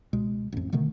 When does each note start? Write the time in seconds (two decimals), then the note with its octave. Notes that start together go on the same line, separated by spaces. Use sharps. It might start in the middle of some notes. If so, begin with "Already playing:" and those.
0.13 C#2 B2 G#3
0.52 A1 F2
0.72 B2 D3 D#3 A3